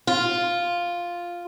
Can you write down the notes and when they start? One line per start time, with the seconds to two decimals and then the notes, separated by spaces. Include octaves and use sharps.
0.07 F4